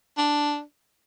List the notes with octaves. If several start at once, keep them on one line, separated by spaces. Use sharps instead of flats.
D4